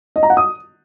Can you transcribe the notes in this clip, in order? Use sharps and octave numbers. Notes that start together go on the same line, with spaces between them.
D#5
A#5
F#5
D#6